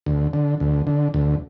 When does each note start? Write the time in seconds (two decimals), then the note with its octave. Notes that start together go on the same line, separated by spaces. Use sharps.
0.06 D2
0.33 D3
0.60 D2
0.87 D3
1.14 D2